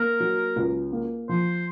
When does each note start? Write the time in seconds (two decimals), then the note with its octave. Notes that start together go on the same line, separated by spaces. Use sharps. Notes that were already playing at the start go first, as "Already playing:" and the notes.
Already playing: A#3 A#4
0.20 F#3
0.56 C#2
0.93 A#3
1.29 F3 C5